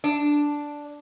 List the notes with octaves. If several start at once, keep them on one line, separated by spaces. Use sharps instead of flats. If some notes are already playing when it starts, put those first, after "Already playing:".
D4